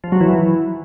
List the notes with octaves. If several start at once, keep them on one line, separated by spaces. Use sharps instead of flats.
F3
F#3
E3